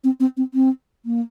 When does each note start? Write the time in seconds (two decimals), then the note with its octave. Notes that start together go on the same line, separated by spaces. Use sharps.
0.04 C4
0.20 C4
0.37 C4
0.54 C4
1.06 A#3